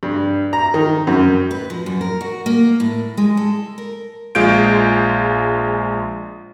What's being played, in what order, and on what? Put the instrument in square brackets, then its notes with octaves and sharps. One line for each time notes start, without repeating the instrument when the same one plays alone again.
[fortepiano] G2
A#5
D#3
F#2
[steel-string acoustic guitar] B4
F3
F#2
A#4
F#4
A#3
A2
G#3
A4
A#4
[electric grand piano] A#1 G#3 F4 G6 D7